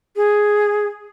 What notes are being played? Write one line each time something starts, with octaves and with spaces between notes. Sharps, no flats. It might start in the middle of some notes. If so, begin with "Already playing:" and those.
G#4